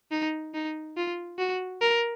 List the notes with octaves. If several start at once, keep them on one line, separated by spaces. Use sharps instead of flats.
D#4
D#4
F4
F#4
A#4